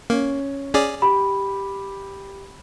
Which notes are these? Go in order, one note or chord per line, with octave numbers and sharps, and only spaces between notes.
A#3 C#4
C#4 G#4 D5
G4 B5